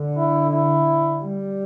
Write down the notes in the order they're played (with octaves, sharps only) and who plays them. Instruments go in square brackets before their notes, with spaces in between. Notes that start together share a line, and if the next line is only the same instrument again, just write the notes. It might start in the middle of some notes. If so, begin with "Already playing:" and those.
Already playing: [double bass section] D3
[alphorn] E4
E4
[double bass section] G3